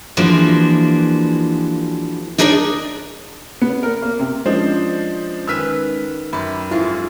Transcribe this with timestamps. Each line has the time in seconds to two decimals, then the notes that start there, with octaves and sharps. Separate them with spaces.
0.17 E3 F3 G#3 A#3 D4 F#4
2.38 D4 D#4 G#4 A#4 B4 D5
3.61 B3
3.83 A#4
4.02 A#3
4.19 C3
4.46 F3 G#3 C#4 D4 C5 D#5
5.47 D#3 B4 G#5 E6 F6 B6
6.33 F#2 G4 B5
6.71 F2 G#2 E4 F4 G#4 E5